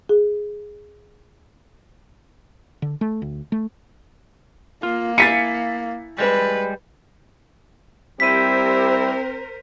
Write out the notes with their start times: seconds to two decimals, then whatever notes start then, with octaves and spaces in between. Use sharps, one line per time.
0.09 G#4
2.82 D3
3.01 A3
3.22 D2
3.52 A3
4.83 A#3 F4
5.18 E4 F5 G#5 A6 B6 C#7
6.18 G3 G#3 B4
8.20 G3 C4 E4 G4 A#4 C5 B6 D#7